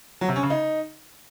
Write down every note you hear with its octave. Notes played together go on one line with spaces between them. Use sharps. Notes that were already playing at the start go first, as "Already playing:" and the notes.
F#3
C3
C#4
C#3
D#4